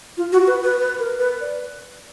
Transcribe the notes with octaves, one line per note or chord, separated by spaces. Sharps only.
F4
F#4
B4
B4
B4
A#4
B4
D5